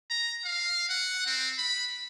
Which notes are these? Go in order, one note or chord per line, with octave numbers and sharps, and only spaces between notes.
A#5
F5
F#5
C4
B5